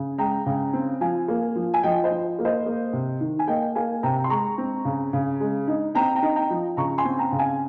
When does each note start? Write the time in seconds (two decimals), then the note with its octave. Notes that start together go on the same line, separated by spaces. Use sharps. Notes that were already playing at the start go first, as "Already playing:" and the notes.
Already playing: C#3
0.18 G#3 G5 A#5
0.46 C#3
0.73 C4
1.01 F3 F5 G#5
1.28 A#3
1.56 F3
1.74 G#5
1.83 F3 D#5 G5
2.04 C5 D#5
2.11 F3
2.39 A#3
2.45 C5 D#5
2.66 A#3
2.93 C3
3.20 D#3
3.39 G#5
3.48 A#3 D#5 G5
3.75 A#3 F5 G#5
4.03 C3 G5 A#5
4.24 C6
4.30 G#3 A#5 C#6
4.58 C4
4.85 C#3
5.13 C#3
5.40 G#3
5.68 D#4
5.95 C4 G5 A#5
6.16 G5 A#5
6.23 D#4
6.36 G5 A#5
6.50 F3
6.77 C#3 A#5 C#6
6.98 G#5 C6
7.05 C4
7.19 G5 A#5
7.32 C#3
7.39 F5 G#5